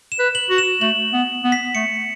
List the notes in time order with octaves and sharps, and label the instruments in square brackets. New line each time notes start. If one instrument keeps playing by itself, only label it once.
[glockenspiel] E7
[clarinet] B4
[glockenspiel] F#7
[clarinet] F#4
[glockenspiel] E7
[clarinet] A3 [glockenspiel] F#7
[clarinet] B3
B3
[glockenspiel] B6
[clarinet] A3 [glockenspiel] C#7